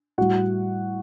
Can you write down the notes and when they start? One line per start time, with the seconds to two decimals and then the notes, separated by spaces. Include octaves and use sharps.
0.18 A2 G3 F#4 F#5